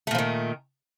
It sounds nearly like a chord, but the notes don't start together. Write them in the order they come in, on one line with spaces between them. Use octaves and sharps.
A3 A#2 F3 D#3